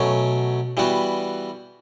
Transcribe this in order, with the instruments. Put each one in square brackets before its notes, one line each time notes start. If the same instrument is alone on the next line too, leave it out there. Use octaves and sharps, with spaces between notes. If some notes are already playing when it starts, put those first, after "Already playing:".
Already playing: [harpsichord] B2 F#3 A3 C#4
E3 G3 B3 F#4